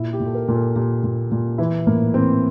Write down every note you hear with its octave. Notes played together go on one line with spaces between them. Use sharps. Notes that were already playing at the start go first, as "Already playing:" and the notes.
Already playing: A#2 E4
G4
A#2
A4
A#4
A#2
A4
A#2 G4
A#2
A#2
E3 E4
A2 A#3
E3 C4